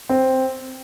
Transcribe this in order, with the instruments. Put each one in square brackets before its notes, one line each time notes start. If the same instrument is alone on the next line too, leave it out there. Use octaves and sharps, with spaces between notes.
[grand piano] C4